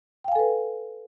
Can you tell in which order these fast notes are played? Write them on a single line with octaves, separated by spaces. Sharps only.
G5 F5 G#5 A4 B4